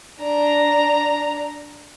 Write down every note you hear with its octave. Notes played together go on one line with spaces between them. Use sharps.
D4 A#5